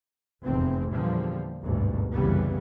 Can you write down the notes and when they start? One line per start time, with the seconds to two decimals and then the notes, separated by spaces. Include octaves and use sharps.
0.44 F1 E2 A2 C4
0.91 E2 A#2 D3 F3 G3
1.61 G#1 D2 G2 B2
2.12 C2 F#2 C#3 E3 G3 B3